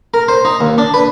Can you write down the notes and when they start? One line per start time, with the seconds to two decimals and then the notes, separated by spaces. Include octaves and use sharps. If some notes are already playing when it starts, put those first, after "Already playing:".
0.14 A#4
0.28 C5
0.45 D#4
0.61 D#2
0.78 D4
0.94 B4